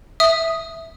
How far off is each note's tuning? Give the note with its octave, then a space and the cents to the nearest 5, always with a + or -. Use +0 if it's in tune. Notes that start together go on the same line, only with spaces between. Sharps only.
E5 +0 D#6 +0